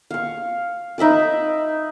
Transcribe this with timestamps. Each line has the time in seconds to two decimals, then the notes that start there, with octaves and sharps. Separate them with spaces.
0.10 F5 C#6
0.98 D#4 E5 B5 D6